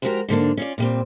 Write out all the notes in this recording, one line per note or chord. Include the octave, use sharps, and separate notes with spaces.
F3 G#3 E4 F#4 G4 A#4
G#2 D3 A#3 D4
C#4 F4 D5
A#2 G3 C4